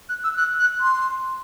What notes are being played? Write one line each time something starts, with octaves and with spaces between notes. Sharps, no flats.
F#6
E6
F#6
F#6
C6